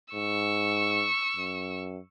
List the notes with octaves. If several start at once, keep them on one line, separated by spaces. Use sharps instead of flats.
G#2 C#6 E6
F#2